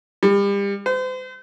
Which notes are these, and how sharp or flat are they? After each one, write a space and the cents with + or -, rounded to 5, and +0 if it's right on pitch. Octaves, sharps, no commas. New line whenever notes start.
G3 +35
C5 -40